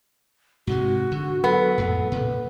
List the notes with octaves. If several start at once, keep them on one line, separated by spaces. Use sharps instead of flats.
G#2 C3 G#3 F#4
D3
F#3 B3 A4
F2 A2
A#2 C#3